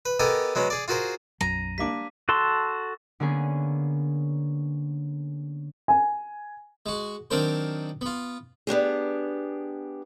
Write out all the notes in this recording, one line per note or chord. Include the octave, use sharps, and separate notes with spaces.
B4
B3 G4 A4 A#4 D#5 G#5
F#3 G#3 B3 C#4
G#4 D5
F4 F#4 G#4 A#4 C5
B1 F#2 F#3 A#5 D#7
G3 A#3 D4 D6 B6
F#4 A4 A5 C6
D3 A#3 B3 C#4 G#4
G#5
G#3 F#4
D#3 F#3 C4 D4 A#4 C5
B3 F4
B3 D4 G4 G#4